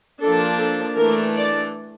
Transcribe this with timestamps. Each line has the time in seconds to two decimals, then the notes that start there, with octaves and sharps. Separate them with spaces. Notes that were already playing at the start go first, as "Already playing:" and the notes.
0.21 F3 A#3 D4 A4
0.58 A4
0.97 E3 A3 D4 A#4
1.36 D5